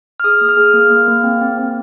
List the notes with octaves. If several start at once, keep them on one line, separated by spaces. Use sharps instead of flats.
F6
G#4 D#6
A#3
F6
G#4
A#3
A#3
A#3
C4
C4
C4